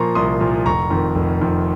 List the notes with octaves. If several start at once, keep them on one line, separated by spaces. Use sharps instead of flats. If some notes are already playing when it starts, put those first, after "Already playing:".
Already playing: A#2 F3 A#3 A#5 C6 C#6
C2 C6 D#6
A#2 F3 A#3
F1 A#5 C#6
F2 D#3
F1
F2 D#3